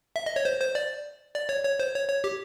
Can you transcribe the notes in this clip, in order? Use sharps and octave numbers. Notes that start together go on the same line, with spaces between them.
E5
D#5
C#5
C5
C5
D5
D5
C#5
C#5
C5
C#5
C#5
G4